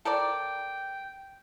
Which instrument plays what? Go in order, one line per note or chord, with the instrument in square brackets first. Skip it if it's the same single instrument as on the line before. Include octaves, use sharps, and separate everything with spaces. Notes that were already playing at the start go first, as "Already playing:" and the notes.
[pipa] A4 A#4 D5 [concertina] G5